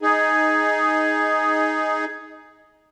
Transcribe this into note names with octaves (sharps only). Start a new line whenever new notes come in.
D#4 G#4